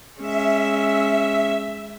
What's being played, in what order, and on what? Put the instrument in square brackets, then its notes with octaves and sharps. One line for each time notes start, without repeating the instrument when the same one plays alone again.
[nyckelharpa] G#3 C#4 [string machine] E5